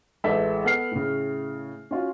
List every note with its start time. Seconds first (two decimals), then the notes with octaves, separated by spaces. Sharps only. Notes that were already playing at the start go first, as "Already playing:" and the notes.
0.24 A1 G#3 A4 E5 B6
0.64 B3 A4 F#5 F6 C7
0.91 A2 C#3
1.91 C#4 F4 F#4